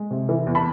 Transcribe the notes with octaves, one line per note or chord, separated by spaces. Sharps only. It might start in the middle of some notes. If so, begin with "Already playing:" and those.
Already playing: G#3
C3
E3
E2
A5 B5